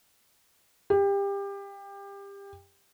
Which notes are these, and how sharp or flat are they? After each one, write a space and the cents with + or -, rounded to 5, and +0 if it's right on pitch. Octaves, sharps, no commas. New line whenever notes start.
G4 +25